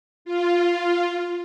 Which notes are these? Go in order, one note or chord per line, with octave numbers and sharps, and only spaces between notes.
F4